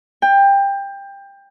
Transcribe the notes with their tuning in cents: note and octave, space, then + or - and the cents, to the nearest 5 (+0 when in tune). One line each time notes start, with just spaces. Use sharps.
G5 +20